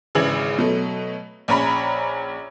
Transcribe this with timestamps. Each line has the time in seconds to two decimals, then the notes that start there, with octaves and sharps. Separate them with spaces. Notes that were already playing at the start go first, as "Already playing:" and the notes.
0.15 G#1 C#3 E3 G#6 F#7
0.58 B2 F#3 A3
1.48 A#1 C#4 C#5 A#5 B5